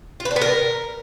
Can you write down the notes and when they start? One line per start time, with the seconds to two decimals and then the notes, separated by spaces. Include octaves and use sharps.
0.20 F4
0.25 B4
0.31 D4
0.36 B3
0.42 A#4